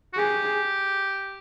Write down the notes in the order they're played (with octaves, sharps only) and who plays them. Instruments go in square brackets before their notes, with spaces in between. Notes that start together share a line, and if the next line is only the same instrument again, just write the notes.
[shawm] F#4
[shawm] G4 [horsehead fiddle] G#4